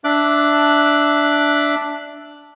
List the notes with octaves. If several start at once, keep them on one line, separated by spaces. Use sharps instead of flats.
D4 E5 D6 F#6